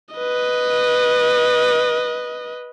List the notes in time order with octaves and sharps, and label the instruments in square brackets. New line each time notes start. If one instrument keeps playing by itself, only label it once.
[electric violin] B4 D#5